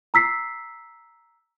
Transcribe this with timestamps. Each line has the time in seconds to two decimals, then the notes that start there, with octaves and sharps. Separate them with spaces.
0.14 A#5 E6 B6 C7